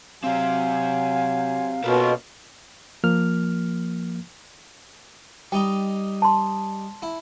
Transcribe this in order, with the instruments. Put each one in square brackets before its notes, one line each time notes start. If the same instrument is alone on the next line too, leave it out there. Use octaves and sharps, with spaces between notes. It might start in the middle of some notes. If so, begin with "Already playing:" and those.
[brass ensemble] F#3 G#5 [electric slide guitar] C4 G4 [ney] F5
[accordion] B2 [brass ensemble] A#3 C#4 F4 [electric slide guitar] A4 B4
[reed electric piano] F3 A#3 F6
[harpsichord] G3 D#4 [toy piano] G5
[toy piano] A5 C6
[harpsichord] E4